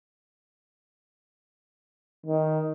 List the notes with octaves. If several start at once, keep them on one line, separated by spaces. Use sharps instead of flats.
D#3